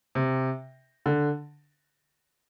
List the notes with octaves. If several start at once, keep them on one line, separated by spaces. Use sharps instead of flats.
C3
D3